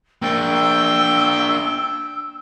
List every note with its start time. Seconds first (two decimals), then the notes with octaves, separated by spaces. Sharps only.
0.22 A#3 D4 G5 E6